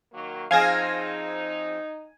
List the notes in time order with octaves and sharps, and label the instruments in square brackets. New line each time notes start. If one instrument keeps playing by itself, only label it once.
[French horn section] D#3 F#3 A#3
[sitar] F3 C4 G#4 [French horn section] D#4 [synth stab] F5 G#6 A#6 [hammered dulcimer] G#5